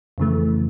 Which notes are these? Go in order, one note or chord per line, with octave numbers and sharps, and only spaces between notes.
F2 C#3 E3 A3